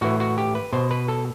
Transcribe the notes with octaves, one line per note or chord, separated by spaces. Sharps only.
A2 E3 F#4
F#4
G4
B4
B2 C5
B4
A4